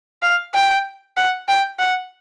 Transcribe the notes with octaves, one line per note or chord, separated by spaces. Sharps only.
F5
G5
F#5
G5
F#5